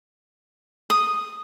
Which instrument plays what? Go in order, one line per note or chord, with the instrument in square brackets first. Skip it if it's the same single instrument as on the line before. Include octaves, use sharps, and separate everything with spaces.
[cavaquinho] D#6